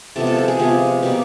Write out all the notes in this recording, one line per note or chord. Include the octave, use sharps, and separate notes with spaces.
C3 F3 G#3 B3 A4
A4
A4
G#4
C3 F3 G#3 B3
B2 G3 A#3